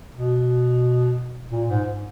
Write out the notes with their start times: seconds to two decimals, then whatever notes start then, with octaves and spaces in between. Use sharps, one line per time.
0.15 B2
1.51 A#2
1.69 G#2